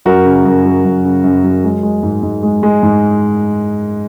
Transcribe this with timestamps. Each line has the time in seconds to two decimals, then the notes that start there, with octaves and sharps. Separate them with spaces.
0.05 F#2 F#4 A#4
0.25 C#3
0.45 F#2
0.65 F#3
0.85 F#2
1.05 C#3
1.24 F#2
1.44 F#3
1.64 G#3
1.83 G#3
2.03 G#2
2.23 G#2
2.43 G#3
2.63 G#3
2.83 G#2